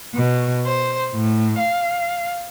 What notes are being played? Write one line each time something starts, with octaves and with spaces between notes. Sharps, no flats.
B2
C5
A2
F5